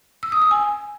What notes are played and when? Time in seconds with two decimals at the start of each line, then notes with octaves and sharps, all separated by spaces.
0.23 E6
0.32 D#6
0.42 E6
0.51 G#5